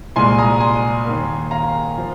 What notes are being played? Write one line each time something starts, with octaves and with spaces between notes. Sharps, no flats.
C2 A#2 G#3 G#5 C6
A#5 D#6
G#5 C6
D#2 D#3 A#3
F5 A#5
F3